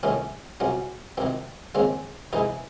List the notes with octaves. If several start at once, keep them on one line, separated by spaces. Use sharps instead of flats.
C2 C3 D#3 A3 C#4
C2 C3 F#3 C#4
C2 C3 D#3 C4
D#2 C#3 G#3 C4
C2 C3 E3 G#3 D#4